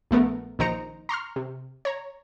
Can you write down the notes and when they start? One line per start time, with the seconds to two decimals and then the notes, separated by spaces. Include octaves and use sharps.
0.11 A#1 A3 B3 A#4
0.59 A#1 D#3 D#4 C5 A#5 C#7
1.09 A#5 C6 C#6 F6
1.36 C3
1.85 C#5 A#5